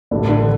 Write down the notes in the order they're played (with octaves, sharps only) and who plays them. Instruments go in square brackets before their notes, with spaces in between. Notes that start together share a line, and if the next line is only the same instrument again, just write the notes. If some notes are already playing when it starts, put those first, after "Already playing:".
[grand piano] A1 A2 G3 D4 [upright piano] D3
[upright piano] D3